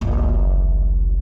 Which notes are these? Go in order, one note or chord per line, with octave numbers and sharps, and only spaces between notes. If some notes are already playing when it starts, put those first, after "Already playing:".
F#1 C2